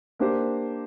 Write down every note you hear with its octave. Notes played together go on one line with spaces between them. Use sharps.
A#3 D4 G4 C5